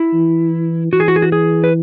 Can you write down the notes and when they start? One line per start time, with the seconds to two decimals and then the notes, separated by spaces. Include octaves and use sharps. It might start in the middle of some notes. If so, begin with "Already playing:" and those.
Already playing: E4
0.14 E3
0.93 E3 F#4
1.00 G#4
1.08 F#4
1.16 G#4
1.22 F#4
1.32 G#4
1.64 B4